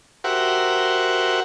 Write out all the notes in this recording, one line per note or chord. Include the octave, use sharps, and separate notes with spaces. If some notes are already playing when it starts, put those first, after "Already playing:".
F#4 G4 A#4 C5 E5 F#5